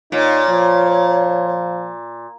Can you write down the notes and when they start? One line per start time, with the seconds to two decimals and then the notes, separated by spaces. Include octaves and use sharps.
0.12 A#2 D#4 C#5
0.50 F3